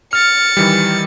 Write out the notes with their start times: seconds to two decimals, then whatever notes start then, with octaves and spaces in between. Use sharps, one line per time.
0.13 F6 A6 C#7
0.57 D#3 E3 G3